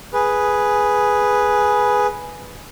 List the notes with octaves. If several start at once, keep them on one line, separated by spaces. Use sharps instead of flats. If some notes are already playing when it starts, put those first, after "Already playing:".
G#4 B4